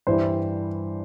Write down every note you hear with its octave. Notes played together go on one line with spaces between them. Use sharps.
G2 E3 G3 C5